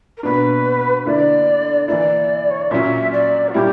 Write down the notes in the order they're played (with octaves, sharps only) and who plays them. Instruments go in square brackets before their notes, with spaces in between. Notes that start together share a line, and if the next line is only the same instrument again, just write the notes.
[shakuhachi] A#4
[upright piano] B2 A#3 D4 [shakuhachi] B4
[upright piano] D3 A#3 E4 [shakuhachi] D5
[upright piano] E3 A#3 E4 [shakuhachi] D5
[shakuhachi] C#5
D5
[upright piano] A#2 F#3 C#4 [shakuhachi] E5
[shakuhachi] D5
F#4
[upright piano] A#2 G3 C#4 E4 [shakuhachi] G4